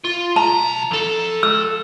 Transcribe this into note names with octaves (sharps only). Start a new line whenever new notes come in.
F4
B1 A5 A#5
F2 A4
E6